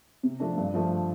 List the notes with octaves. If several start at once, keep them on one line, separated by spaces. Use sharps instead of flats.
C3
F3 A3 D4
G2
F3 A3